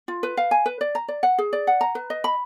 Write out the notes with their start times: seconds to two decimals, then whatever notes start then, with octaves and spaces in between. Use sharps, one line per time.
0.08 F4
0.23 B4
0.37 F5
0.51 G#5
0.66 B4
0.81 D5
0.95 A#5
1.08 D5
1.23 F#5
1.38 G#4
1.53 D5
1.67 F#5
1.81 A#5
1.95 B4
2.10 D#5
2.24 B5